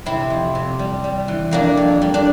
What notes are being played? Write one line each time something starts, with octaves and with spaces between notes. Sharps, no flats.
C3 C4 E4
F2
C3
G3
G3
E3
F2 A#3 D4
F2
G3
D4